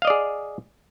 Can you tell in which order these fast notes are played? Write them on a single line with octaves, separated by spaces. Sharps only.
F5 D#5 D5 G#4